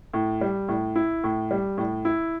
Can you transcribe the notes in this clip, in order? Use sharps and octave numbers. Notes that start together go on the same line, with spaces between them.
A2
G3
A2
E4
A2
G3
A2
E4